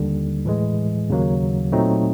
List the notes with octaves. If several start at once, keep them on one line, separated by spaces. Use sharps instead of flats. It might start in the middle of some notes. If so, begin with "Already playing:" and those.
Already playing: D#2 D3 G3
A2 E3 G#3
D#2 C#3 F#3 A#3
A#2 F#3 A3 C4 D#4